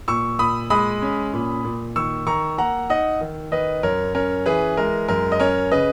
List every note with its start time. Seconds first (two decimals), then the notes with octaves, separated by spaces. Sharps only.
0.08 A#2 C#6 E6
0.39 A#2 B5 D#6
0.70 G#3 B5 D#6
1.02 C#4
1.33 A#2
1.65 A#2
1.96 D#3 C#6 E6
2.26 D#3 A#5 C#6
2.58 A#3 F#5 A#5
2.90 D#4 D#5 F#5
3.21 D#3
3.52 D#3 B4 D#5
3.83 F#2 A#4 C#5
4.15 C#4 A#4 C#5
4.46 E3 G#4 B4
4.77 G#3 A#4
5.08 F#2 A#4
5.32 D#5
5.40 C#4 A#4 C#5
5.71 C#3 B4 D#5